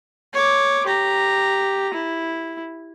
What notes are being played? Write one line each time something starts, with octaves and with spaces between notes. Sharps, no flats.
C#5 D6
G4 A#5
E4